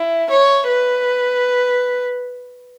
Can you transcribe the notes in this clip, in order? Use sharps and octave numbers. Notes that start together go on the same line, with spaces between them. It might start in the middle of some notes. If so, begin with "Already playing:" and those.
Already playing: E4
C#5
B4